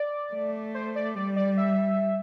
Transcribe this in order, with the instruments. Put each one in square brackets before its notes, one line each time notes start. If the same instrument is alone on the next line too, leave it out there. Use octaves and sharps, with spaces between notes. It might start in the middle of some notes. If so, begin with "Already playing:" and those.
Already playing: [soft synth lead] D5
[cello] A3
[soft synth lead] C5
D5
[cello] G3 [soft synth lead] D5
[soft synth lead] D5
E5